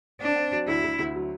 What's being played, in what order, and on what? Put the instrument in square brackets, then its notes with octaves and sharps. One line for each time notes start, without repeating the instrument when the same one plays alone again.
[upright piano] C4 [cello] D4
[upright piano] C4
F#3
[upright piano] D2 [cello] E4
[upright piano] D2
D2
F#3